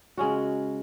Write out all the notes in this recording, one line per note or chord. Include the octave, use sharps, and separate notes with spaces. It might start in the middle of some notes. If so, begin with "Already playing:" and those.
C#3 G#3 C#4 F#4